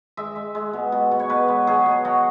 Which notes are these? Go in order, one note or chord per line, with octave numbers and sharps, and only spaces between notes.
G#3 E5
G#3
G#3
B2
B2
B2
C#5
B2 B4
G#3
F#3 G#4
B2
F#3 F#4